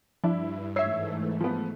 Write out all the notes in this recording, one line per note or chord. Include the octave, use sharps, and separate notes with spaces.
G2 F3 D4 E4
G#2 E3 A3 C#5 E5 E6 G#6 C7
F3 B3